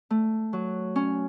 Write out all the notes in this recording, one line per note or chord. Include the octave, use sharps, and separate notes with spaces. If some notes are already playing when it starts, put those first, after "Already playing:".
A3
F#3
C#4